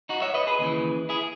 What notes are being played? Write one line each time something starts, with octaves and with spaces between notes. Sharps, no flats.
D#4 F#4
C#5 E5
B4 D#5
G#4 B4
D#2 C#3 E3
E4 G#4